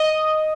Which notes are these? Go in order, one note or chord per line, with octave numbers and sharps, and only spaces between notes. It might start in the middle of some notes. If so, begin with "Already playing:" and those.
Already playing: D#5